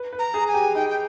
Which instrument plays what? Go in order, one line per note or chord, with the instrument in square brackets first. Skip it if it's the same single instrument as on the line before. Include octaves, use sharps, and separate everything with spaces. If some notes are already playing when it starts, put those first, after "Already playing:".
Already playing: [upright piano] B4
B4
[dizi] A#5
[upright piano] G#4
[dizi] G#5
[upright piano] G4
[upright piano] D#4 [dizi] G5
[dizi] G5